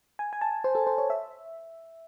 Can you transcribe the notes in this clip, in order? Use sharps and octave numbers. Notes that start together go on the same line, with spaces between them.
G#5
G#5
A5
C5
A4
C5
C#5
E5